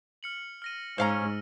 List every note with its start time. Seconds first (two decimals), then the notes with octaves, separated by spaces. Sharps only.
0.23 F6 C#7 F#7
0.62 F6 A#6 D#7
0.98 G#2 C#4 C5 F5 A#5 E6 F6